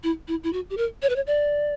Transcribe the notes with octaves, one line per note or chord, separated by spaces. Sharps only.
E4
E4
E4
F#4
G4
A#4
C#5
B4
C#5
D5